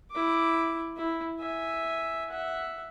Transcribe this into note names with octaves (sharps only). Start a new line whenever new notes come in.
E4 D6
E4
E5 G#5
E5 F#5